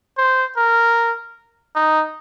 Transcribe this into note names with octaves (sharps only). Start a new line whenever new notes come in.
C5
A#4
D#4